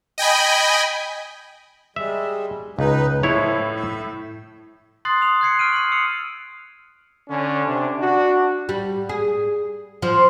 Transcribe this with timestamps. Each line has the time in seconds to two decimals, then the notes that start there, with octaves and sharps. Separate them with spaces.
0.18 D#5 G5 G#5 B5
1.96 G3 G#3 E5
2.79 C#2 D#4 B4
3.23 A2 F3 E4 C#5
3.75 E5
5.05 C6 D#6 F#6 A6 C7
5.21 D#6 F7
5.41 F#6 G#6 C7 C#7
5.59 C#6 F6 D7 D#7
5.72 C7 F#7
5.91 D#6 E6 C#7 F7
7.29 D3 C#4
7.67 C3 D4
8.00 D4 F#4
8.69 G3
9.09 G#4
10.02 F3